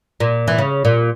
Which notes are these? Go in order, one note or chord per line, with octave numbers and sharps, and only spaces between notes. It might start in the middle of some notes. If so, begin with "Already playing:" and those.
A#2
E3
C#3
A#2